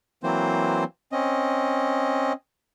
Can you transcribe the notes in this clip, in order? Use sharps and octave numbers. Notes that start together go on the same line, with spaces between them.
E3 F#3 A#3 C4 C5
C4 C#4 D#5